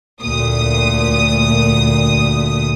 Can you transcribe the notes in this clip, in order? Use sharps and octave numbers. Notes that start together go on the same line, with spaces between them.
D2 A#2 D#6